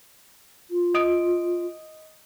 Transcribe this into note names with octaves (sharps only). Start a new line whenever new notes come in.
F4
D#5 D#6 D7